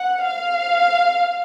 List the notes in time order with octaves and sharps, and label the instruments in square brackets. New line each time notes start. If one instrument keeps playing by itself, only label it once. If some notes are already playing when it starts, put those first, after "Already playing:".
Already playing: [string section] F#5
F5